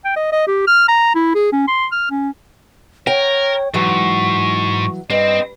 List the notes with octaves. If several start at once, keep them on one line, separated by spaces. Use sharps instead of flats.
G5
D#5
D#5
G4
F6
A#5
E4
G#4
C#4
C6
F6
C#4
A#4 C#5 G5
G#2 E3 F#3 C#6
G2 C4 D#5